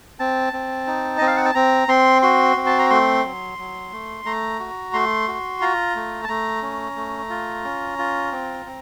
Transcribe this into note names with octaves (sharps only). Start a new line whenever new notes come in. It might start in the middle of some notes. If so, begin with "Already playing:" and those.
C4 A5
C4
D#4
C4 D#5
F5
F#5
A5
C4 A#5
C4 C6
F#4 C6
C4
A5
A#5
A3 C6
F#3
F#3
A3
A3 A#5
F#4
A3 C6
F#4
F4 A#5
A3
A5
A3 A#5
C#4
A3
F4
C#4
F4
C4
C4